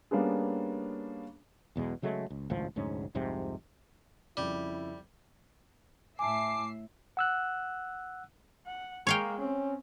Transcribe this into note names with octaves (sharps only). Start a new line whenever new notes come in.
G3 A#3 B3 C#4 D4 G#4
B1 E2 B2 G#3
C#3 F#3 G#3 A3
C#2
G#1 C#2 A2 F3
F1 D2 G#2 C#4
C2 F2 G#2 C3
F2 C#3 G3 E4
A2 E5 G#5 A5 D6 C7
F#5 E6 F#6
F#5
G#3 A#3 C#5 F5 G5
C4 C#4